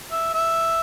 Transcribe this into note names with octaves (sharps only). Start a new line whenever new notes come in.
E5
E5